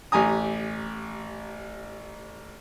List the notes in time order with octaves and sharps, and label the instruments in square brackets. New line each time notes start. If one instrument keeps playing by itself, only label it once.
[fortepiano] A1 G4 G#5 A#5 D#6